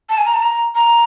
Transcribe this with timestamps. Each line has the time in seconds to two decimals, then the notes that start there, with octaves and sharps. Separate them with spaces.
0.10 A5
0.18 G#5
0.26 A#5
0.34 A5
0.42 A#5
0.75 A#5